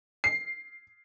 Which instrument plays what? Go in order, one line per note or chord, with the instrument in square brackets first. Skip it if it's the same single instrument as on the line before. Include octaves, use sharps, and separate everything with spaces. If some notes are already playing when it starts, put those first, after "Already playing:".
[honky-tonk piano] C7